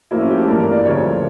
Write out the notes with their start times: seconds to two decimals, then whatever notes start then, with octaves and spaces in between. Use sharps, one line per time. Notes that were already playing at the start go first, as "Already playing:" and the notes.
0.11 A2 F3 A#3 E4
0.20 C#4
0.30 G4
0.38 A4
0.48 G2 E3 A#3 A#4
0.60 A#4
0.72 D5
0.85 D2 C#3 F3 A3 C#5